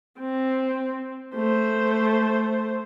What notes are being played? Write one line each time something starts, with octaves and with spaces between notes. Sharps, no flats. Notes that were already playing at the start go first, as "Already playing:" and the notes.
C4
A3 C5